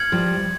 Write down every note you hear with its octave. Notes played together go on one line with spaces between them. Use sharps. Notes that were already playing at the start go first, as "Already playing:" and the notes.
Already playing: F6 G#6 C#7 F#7
F3 G3